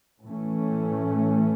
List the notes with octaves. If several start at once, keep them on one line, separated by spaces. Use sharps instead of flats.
A2 E3 A3 C#4